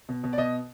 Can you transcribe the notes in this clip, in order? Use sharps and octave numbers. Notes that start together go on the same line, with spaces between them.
B2
B2
D5
B2 D#5